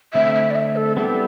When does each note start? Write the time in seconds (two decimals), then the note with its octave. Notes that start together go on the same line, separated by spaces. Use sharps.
0.14 D3 A3 C4 E5
0.35 E5
0.50 D5
0.56 E5
0.76 A4
0.97 G3 B3 E4 G4 A4